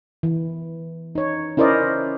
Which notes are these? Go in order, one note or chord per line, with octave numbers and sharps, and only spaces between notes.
E3
D#4 C#5
C#4 E4 A#4 C5 D5 D#5